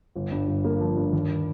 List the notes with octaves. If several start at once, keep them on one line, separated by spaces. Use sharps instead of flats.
G1
G2
G1
A#3
F3
G2
D#2